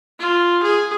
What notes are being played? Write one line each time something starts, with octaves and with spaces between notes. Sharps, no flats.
F4
G#4